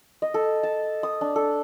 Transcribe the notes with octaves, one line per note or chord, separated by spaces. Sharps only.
D#5
A4
A5
D#6
D4
A4